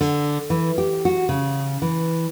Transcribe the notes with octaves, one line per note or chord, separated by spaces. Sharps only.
D3
E3
G4
F#4
C#3
E3